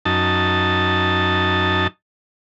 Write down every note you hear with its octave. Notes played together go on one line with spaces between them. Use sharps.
F#2 D#4 A5